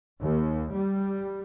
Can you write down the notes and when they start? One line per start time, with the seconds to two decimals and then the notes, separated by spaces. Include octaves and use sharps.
0.19 D#2
0.74 G3